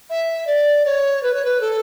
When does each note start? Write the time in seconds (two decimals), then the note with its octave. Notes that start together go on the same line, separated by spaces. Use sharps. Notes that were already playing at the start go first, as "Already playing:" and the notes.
0.10 E5
0.47 D5
0.85 C#5
1.23 B4
1.34 C#5
1.45 B4
1.60 A4